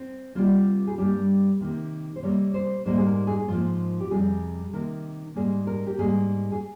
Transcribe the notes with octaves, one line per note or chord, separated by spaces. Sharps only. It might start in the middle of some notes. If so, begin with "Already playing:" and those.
Already playing: C4
C3 G3 A#3 F4
G#4
G2 G3 A#3 G4
C3 D#3 A#3 G4
C5
C3 G3 A#3 C#5
C5
G#2 G3 A#3 C5
G#4
A#4
G#4
G#2 F3 A#3 F4
G4
F2 C3 G3 G#4
C3 D#3 A#3 A#4
G#2 G3 A#3 G#4
A#4
G4
G#2 G3 A#3 G#4
G#4